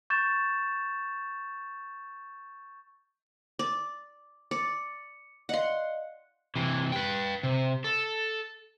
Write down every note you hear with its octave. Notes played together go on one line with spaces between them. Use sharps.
C#6 G6 A6 E7
D5
D5 C#7
D5 D#5 F5 F#5 C6
C3 E3
B4 G5
C3
A4